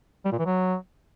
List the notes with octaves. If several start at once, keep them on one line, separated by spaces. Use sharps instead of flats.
G3
A#2
E3
F#3